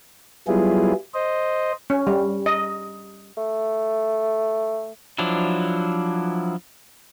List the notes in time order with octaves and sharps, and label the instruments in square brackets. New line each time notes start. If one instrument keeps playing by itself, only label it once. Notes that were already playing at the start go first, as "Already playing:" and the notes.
[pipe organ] F#3 G3 B3 E4 F4 G#4
C5 D#5
[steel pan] C#4
G3
D#5
[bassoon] A3
[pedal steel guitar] F3 F#3 D4 E4